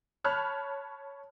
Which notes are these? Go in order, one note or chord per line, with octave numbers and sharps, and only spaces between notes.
C#5 A5 B5 F6 F#6